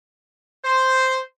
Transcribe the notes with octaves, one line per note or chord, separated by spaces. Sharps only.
C5